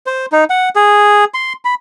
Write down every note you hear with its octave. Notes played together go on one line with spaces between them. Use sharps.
C5
D#4
F#5
G#4
C6
B5